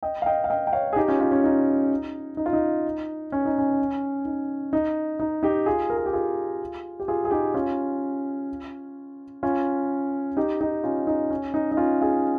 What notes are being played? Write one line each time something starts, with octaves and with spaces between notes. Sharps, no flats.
D#5 G5
F5
D#5 G5
F5
D#5 G5
G5
C#5 F5
G#4
D#4 G4
C#4 F4
C#4 F4
C#4
D#4
D#4
F4
D#4
C#4
D#4
C#4
D#4
D#4
D#4
D#4 G4
F4 G#4
A#4
G#4
G4
F4 G#4
G4
F4 G#4
G#4
D#4 G4
C#4 F4
C#4 F4
D#4 G4
D#4 G4
C#4 F4
D#4
C#4
D#4
D#4
C#4 F4
F4 G#4